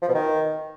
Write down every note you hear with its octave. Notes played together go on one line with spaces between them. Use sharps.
F3
B2
D#3